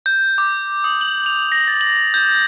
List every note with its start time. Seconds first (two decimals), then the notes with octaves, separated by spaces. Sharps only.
0.06 G6
0.38 D6
0.84 D#6
1.01 F#7
1.26 F7
1.52 A#6
1.68 A6
1.81 F#7
2.14 G6